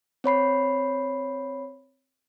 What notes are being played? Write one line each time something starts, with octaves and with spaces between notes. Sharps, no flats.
C4 C#5 B5 C7